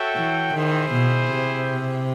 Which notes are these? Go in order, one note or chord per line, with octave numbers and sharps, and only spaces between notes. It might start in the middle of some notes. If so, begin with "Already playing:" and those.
Already playing: F#4 A4 C#5 E5 G5
E3
D#3 E4 G#4 C5
B2
C3